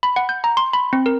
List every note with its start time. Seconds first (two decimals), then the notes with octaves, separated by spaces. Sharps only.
0.03 B5
0.16 F#5
0.29 G6
0.44 A#5
0.57 C6
0.73 B5
0.93 C4
1.06 A#4